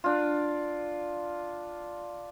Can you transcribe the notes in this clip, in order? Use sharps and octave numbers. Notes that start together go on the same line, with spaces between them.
D4 F4